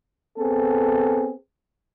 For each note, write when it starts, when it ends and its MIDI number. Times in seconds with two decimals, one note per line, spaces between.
0.37 1.31 59
0.37 1.31 60
0.37 1.31 68
0.37 1.31 69